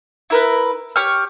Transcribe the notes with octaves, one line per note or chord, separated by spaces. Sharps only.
E4 A#4 B4
G4 C#5 C#6 F6